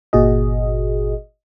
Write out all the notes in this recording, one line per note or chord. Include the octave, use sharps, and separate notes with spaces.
G1 A#2 F#4 G#4 D#5